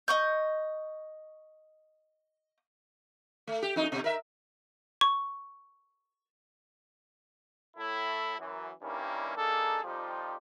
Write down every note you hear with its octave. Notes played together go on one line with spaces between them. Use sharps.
D#5 C#6 G6
A3
G4
F2 D#4
B2
A#4 E5
C#6
A2 E4 A4
F#2 E3
G2 D#3 G3 A#3 C#4 E4
A#3 D4 D#4 G#4 A4
F2 F3 G3 D#4 F4 G4